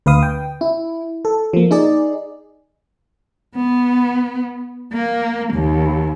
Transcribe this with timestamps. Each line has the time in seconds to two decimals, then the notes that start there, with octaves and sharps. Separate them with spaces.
0.06 D2 B4 F5 D#6
0.23 G5
0.61 E4
1.25 A4
1.53 F3 A#3
1.71 D#4 G#4 D5
3.56 B3
4.93 A#3
5.54 D#2